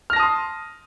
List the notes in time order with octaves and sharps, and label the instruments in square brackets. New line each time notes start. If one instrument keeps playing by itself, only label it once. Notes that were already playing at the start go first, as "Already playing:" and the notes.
[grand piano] F6
A#6
A5
D#6
C6